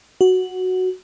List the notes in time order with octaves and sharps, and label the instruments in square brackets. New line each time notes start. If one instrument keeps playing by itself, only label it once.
[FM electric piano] F#4